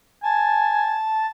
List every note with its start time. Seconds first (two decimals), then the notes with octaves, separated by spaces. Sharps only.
0.23 G#5 A5